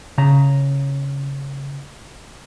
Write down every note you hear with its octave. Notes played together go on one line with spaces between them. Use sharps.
C#3 A#5